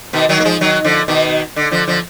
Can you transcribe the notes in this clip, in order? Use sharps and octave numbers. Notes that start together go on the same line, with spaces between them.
B2 D#3
D#3 F#3
A#3
F3 G#3
D#3 F#3
D3 F3
B2 D#3
D3
D3 F3
D3 F3